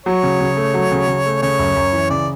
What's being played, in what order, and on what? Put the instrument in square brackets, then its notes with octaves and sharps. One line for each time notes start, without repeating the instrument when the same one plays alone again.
[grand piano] F#3 [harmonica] C#5
[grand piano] C#3
C#3
A3
F#3
C#3
C#3
A3
[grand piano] C#3 [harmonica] C#5
[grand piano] F#2
F#2
E3
[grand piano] C#3 [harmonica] D5